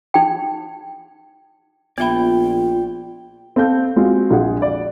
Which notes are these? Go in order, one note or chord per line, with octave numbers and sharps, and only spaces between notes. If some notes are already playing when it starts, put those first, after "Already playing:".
D#4 G5
A#1 B3 F4 D5 E5 G5 B5
C4 A4 F5 G6
G#3 C4 F4 F#4
A#1 F4 G#4 F#5
D5